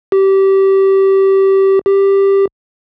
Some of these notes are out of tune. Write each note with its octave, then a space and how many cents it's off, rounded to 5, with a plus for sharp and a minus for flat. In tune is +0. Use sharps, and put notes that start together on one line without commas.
G4 -20
G4 +5